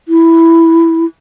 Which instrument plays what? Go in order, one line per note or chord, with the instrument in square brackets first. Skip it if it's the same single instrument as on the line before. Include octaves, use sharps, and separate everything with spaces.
[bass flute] E4